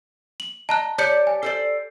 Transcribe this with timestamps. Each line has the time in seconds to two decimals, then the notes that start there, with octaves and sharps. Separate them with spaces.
0.40 F#7
0.69 D#5 A5 A#5 F#6
0.98 G4 C#5 D5 A5 G6 C#7
1.27 G#5
1.43 A4 C5 D5